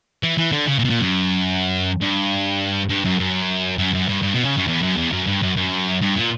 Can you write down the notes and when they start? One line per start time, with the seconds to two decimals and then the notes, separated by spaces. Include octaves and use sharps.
0.23 E3
0.38 E3
0.52 D3
0.67 C#3
0.79 A#2
0.84 B2
0.90 A#2
1.00 F#2
2.01 G2
2.89 G2
3.05 F#2
3.19 F#2
3.78 F#2
3.94 F#2
4.08 G2
4.22 G2
4.34 B2
4.45 C#3
4.57 F#2
4.67 E2
4.82 F#2
4.97 E2
5.12 F#2
5.27 G2
5.42 F#2
5.56 F#2
6.02 G2
6.16 A#2